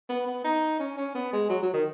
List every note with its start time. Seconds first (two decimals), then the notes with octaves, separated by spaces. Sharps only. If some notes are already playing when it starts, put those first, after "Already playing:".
0.09 B3
0.27 B3
0.44 D#4
0.79 C#4
0.97 C#4
1.15 B3
1.33 G#3
1.50 F#3
1.63 F#3
1.73 D#3